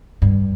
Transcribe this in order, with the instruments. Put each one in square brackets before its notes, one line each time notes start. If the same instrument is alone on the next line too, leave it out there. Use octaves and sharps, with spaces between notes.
[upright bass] G2